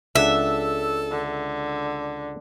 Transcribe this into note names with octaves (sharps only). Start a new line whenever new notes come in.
C#2 D4 A4 E5 F#5
D3